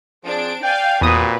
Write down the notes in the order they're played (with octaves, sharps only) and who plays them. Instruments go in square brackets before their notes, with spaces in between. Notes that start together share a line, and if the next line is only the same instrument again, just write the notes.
[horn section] F3 G#4 C5 [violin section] C4 D4 D7
[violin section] D5 F5 G#5 [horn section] G5
[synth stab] E2 D#6 [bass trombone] A#2 [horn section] C4 F#4 B5 [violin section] G4 B4